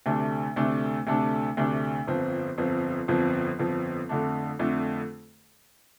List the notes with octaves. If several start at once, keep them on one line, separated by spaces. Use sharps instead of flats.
D2 C3 A3 D4
D2 C3 A3 D4
D2 C3 A3 D4
D2 C3 A3 D4
G1 F2 F3 C4
G1 F2 F3 C4
G1 F2 F3 C4
G1 F2 F3 C4
F2 D3 A3 D4
F2 D3 A3 D4